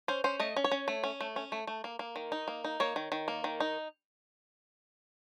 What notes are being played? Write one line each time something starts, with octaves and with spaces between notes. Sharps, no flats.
C#4 C5
C#4 C5
A3 D#5
C#4
C#5
C#4
A3
C#4
A3
C#4
A3
A3
A#3
A#3
D#3
D#4
A#3
D#4
A#3 C#5
D#3
D#3
A#3
D#3
D#4